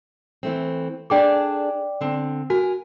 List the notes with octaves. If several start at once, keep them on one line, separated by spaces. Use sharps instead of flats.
E3 A3 C4
D4 G#4 A4 D5 G5 D6
D3 C4
F#4 A#4 G#5